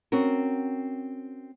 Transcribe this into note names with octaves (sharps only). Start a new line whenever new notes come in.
C4 C#4 F#4 A#4